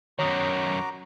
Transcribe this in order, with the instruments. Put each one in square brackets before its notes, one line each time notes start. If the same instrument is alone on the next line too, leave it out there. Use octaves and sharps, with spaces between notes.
[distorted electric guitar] F#2 D#3 [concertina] F#4 A#5 D6 [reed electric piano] C#5 D#6